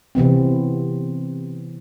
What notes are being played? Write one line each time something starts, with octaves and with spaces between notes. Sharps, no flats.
C3 E3 B3 C4